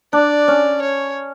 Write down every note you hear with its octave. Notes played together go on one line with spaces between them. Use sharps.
D4 D5
C#4
C#5